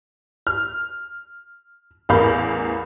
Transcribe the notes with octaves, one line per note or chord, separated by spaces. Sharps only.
F6
A1 E2 A#4 F5 B5 G6